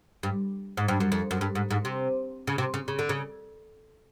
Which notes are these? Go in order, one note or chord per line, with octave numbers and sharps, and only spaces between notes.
G2
G#2
G2
F#2
F2
F#2
G2
G#2
G#2
C3
C#3
C3
C#3
C#3
D3
C#3